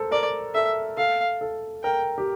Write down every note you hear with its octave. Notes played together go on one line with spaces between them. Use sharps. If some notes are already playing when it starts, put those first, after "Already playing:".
Already playing: A4 A#4 C5
A#4 D5
A4 E5
A4 F5
A4
A#4 G5
G4